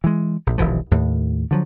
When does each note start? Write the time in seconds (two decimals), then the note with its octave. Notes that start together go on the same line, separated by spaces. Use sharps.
0.04 E3 G#3
0.47 A#1
0.58 D#1 B1 E3 F3
0.91 D#2 A2
1.51 D3 F3 F#3